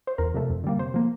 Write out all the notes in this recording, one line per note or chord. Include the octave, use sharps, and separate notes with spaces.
C5
E2 A#4
C3 F3 A3
F2
D3 G3 A#3
C3 C5
F3 A#3